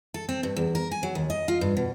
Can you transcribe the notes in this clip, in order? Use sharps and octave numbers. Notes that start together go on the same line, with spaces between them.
A4
C4
G2
E2
A#4
G#5
F#3
D#2
D#5
F4
G2
B2